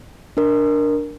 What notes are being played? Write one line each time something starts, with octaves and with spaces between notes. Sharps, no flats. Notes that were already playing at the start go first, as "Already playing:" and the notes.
D4 A#4